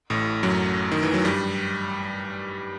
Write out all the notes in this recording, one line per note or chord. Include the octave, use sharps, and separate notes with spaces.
A1 A2
F#2 F#3
D#3
E3
F#3
G2 G3